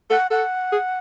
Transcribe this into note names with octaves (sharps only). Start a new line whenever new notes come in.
A4 F#5
A4 F#5
G#4